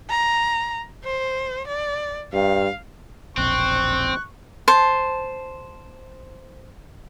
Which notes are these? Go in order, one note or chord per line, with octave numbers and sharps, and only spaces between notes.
A#5
C5
D5
G2 F5
E1 A#1 C4 C#6 F#6
C5 A5